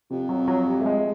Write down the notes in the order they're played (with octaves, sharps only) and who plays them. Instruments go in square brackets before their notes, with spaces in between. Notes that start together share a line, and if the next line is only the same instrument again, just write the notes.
[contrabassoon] F2 [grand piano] C3
[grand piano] F#3
F#3
G3
A3
G#3